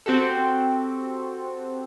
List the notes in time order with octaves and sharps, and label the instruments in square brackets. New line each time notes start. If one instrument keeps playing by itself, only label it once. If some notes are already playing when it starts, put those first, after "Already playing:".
[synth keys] C4 F#4 G4 A4